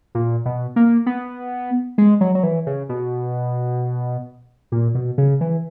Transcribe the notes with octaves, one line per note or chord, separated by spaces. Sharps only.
A#2
B2
A#3
B3
G#3
F#3
F#3
E3
C#3
B2
A#2
B2
C#3
E3